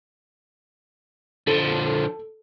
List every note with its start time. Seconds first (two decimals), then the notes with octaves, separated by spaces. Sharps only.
1.47 D3 F3 A4